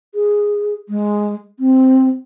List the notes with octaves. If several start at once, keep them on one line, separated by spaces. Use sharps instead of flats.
G#4
G#3
C4